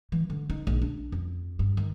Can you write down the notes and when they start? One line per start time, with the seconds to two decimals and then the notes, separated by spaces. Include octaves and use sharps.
0.12 E3
0.30 D3
0.50 D#4
0.67 A#1
0.82 D4
1.12 F2
1.59 G2
1.77 D#3